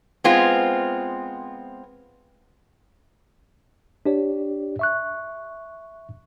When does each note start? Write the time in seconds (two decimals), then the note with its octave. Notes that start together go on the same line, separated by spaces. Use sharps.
0.24 G#3 B3 C4 F4
4.06 D4 G4 C#5 D5
4.79 E5 C#6 F#6